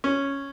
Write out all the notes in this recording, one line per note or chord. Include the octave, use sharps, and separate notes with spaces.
C#4